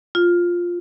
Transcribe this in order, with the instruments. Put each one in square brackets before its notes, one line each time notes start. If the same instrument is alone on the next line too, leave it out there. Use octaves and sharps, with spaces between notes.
[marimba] F4